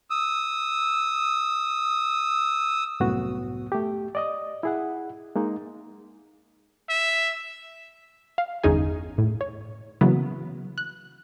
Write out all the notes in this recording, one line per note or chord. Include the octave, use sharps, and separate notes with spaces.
D#6 E6
C2 F#2 A2 B3 F#4
A3 G4
D5 D#5 D#6
E4 G#4 F#5
G#3 A#3 D#4
E5
F5
G1 E2 C#4 D#4 G#4 G#5
A2
C#5
C#3 E3 F#3 A#3 B3
F#6